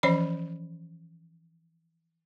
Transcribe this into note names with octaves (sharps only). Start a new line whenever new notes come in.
E3 F3 C#4 C5 C#5 B5